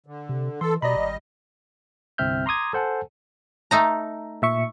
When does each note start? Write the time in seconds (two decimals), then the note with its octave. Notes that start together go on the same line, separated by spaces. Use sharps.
0.06 D3
0.29 C3
0.61 E3 A4 C6
0.82 B2 G3 D5 D#5 A#5 B5
0.96 G#1
2.18 G1 C2 C4 E5 F6 G6
2.46 A#5 C6 D6 D#6 G#6
2.73 A4 C5 F#5 G#5 A5
3.71 A3 D#4 A#5
4.42 A#2 E5 C#6